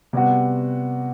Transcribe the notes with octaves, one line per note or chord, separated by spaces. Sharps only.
C3 G3 B3 F#4